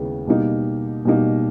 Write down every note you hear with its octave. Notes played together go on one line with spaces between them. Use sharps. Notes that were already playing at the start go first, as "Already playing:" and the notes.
Already playing: D#2 C#3 G#3 B3 E4
B2 G3 A#3 D#4
B2 G3 A#3 D#4